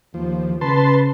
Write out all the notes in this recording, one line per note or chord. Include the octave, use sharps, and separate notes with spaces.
D#2 F3
C#3 B4 A5 C6